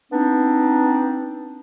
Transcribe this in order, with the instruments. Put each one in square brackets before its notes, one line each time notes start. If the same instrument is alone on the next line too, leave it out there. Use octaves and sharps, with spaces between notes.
[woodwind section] B3 C4 D4 D#4